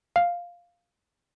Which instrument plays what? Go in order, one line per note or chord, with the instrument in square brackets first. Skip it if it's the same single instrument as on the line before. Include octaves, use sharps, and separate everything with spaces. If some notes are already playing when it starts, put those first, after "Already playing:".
[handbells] F5